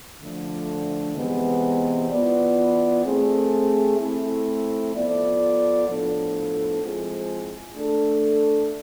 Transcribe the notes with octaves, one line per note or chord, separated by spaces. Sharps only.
D3 F3 A3
C3 E3 G#3 B3
E3 B3 F4 B4 D5
A3 C4 G#4
A3 C4 E4
F3 B3 F4 A4 D5
A2 F3 B3 D4 A4
F3 G#3 C4 E4 G#4
A3 D4 A4